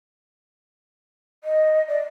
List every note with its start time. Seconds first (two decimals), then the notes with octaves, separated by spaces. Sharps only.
1.44 D#5
1.88 D5